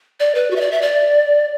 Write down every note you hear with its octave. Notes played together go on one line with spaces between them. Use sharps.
D5
B4
F#4
E5
D5
E5
D5